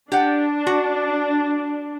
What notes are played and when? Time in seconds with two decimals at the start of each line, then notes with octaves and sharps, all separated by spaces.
0.12 D4 G4 F#5
0.67 F#4